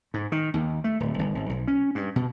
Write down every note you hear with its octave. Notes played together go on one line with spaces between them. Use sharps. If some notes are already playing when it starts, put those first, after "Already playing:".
G#2
D#3
D#2
A3
D1
G1
G#1
B1
C#4
G2
B2